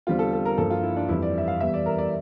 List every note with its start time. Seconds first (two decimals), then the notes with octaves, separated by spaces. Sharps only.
0.07 E2 D3 G3 C4 F4
0.19 A4
0.33 A4
0.45 A#4
0.58 G2 F3 A#3 A4
0.70 F4
0.83 E4
0.97 D4
1.09 F2 E3 G3 E4
1.22 D5
1.38 E5
1.48 F5
1.60 E2 E3 G3 E5
1.74 D5
1.86 A#4
1.98 D5